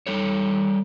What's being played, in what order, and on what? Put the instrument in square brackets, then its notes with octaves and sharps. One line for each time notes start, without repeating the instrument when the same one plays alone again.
[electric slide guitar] G3 A4 C#5